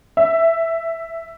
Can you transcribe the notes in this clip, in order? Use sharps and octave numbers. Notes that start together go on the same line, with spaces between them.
E5